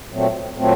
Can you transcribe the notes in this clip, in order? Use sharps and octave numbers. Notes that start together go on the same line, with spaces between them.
A#2 F#3 A3 C4
A#2 F#3 A3 C4